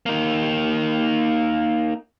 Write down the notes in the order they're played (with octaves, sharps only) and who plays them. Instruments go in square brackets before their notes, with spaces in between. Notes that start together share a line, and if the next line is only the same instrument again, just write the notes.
[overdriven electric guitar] A#3 D#4